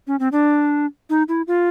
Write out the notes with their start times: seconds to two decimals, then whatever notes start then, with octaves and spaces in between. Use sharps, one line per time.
0.07 C#4
0.20 C4
0.32 D4
1.10 D#4
1.29 E4
1.47 F4